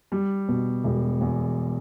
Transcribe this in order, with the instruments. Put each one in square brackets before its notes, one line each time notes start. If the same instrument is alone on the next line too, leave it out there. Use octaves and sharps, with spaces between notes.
[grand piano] G3
B2
E1
E2